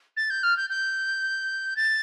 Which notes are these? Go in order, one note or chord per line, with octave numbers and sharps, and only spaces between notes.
A6
G6
F6
G6
G6
A6